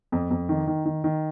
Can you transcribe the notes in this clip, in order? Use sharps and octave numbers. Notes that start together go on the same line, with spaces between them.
F2
F2
D#3
D#3
D#3
D#3